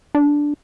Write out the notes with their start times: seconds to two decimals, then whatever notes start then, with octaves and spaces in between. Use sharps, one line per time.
0.15 D4